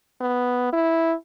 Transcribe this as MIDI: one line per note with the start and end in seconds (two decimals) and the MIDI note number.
0.21 0.72 59
0.73 1.13 64